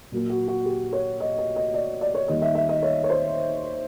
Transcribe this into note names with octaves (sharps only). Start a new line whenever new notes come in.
A#2 F#3 A#3
F#4
F#4
G4
C#5
D#5
D#5
D#5
D5
D5
C#5
D#2 D#3 G3 A#3 D#5
E5
E5
D#5
C#5
C#5
C5